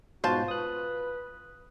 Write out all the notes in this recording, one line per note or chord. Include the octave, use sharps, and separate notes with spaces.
G#2 B2 F4 F#4 C5 A5
B4 D#6 F#6